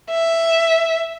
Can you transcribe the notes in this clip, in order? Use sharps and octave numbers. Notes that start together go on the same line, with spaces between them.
E5